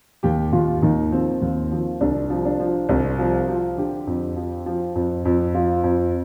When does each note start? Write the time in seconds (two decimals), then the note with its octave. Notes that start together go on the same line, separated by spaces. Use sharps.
0.23 D#2 G4
0.52 D#2 F4
0.82 D#2 D#4
1.12 F3 C4
1.42 D#2
1.71 F3
2.01 C2 D4
2.30 F3
2.45 D4
2.60 F3
2.89 C2
3.19 F3
3.48 F3
3.78 D3 G4
4.07 F2
4.36 F3
4.66 F3
4.95 F2
5.25 F2
5.54 F3 F4
5.84 F2